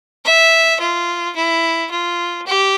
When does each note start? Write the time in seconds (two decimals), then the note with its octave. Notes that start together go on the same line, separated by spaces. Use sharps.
0.25 E5
0.80 F4
1.36 E4
1.91 F4
2.46 G4